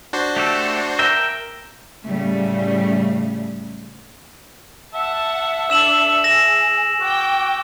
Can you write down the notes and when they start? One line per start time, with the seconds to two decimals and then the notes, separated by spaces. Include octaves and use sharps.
0.13 D4 F#4 C5
0.36 A3 G4 A4
0.99 A#4 E5 G5
2.05 A2 C#3 G3 A3
4.94 E5 F#5 A5
5.70 D4 A4 E6 E7 F#7
6.24 G#4 A#6 E7
7.00 F#4 G5 D6